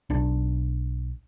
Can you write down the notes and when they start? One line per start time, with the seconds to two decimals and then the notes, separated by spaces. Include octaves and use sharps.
0.10 B1 D4